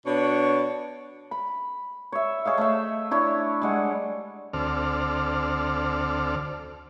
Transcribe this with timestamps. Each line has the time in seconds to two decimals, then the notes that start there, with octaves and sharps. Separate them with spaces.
0.06 B2 D4 C#5
1.31 B5
2.12 C#5 E5
2.45 G#4 C#5 D#5 F5
2.58 A3 C5 E5
3.11 D4 E4 C#5
3.62 G3 G#3 F#5
4.53 D2 C4 A4 D5 F6